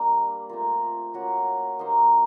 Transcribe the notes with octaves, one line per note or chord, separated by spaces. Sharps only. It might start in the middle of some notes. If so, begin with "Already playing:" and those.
Already playing: G3 A#3 D4
A3 C4 F4 A#4
A#3 C#4 F#4
A#3 D#4 G4 C5